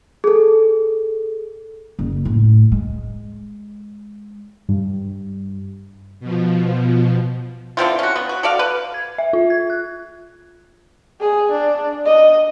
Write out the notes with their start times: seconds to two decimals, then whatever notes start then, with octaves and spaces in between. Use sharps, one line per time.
0.24 G#4 A4
1.99 F#1
2.25 A2
2.72 G#3
4.69 G2
6.20 B2 F3
7.77 D3 E3 C4 F4
7.99 C#4 F#4
8.16 B3
8.29 F#4
8.43 F#4 A4 D5 F5
8.59 B4
8.94 G#6
9.18 E5
9.33 F4
9.50 G#6
9.70 F#6
11.20 G#4
11.51 D4
12.05 D#5